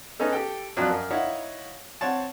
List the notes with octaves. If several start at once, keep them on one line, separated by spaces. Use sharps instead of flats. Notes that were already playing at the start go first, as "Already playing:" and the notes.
B3 C#4 D#4 A4
G4 A4 G5
F2 F3 F#3 D4
F#2
D#4 E4 C#5 F5 F#5
C4 C#5 F#5 A5